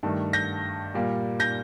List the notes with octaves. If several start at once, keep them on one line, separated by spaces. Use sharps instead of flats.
G2 D#3 A3
G6 A#6
A#2 G3 A#3
G6 A#6